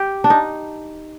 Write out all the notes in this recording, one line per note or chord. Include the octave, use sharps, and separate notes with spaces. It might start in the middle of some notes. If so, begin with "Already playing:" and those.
Already playing: G4
D4
D#4